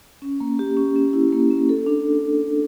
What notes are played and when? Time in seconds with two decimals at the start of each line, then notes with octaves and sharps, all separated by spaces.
0.22 C#4
0.40 A#3
0.59 G4
0.77 C#4
0.96 C#4
1.13 E4
1.32 A#3
1.50 C#4
1.69 A4
1.86 D4